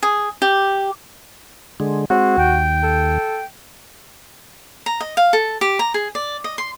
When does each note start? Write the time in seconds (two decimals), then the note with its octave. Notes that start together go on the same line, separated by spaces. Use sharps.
0.03 G#4
0.42 G4
1.80 D3 G#3
2.10 G#3 C4 F#4
2.37 D#2 G5
2.83 A4
4.86 A#5
5.01 D#5
5.17 F5
5.33 A4
5.61 G4
5.79 A#5
5.94 G#4
6.15 D5
6.44 D#5
6.58 C6